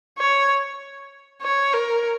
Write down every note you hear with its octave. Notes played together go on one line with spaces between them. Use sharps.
C#5
C#5
A#4